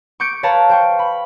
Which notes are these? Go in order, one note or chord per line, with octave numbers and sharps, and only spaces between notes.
C#6 D6 G6 C#7 D7
B4 C#5 F5 A5 A#5
C5 G5 C#6
B5